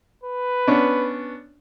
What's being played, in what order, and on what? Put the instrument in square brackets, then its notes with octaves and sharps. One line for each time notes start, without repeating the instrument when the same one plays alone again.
[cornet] B4
[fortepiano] B3 C#4 D4